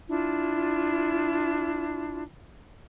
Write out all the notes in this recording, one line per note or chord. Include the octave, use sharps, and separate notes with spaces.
D4 E4 F4